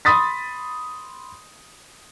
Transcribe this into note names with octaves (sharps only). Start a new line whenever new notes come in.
B5 C6 D#6 A6 B6